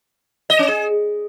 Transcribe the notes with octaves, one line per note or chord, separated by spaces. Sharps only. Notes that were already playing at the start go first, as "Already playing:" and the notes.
D#5
C#4
G#4